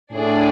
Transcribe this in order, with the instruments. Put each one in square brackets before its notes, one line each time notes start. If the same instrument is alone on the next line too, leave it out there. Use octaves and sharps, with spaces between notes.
[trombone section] A2 [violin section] D4 G#4 D5